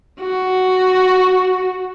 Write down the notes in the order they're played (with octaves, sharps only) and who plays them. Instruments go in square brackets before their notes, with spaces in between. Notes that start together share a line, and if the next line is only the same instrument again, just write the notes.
[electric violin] F#4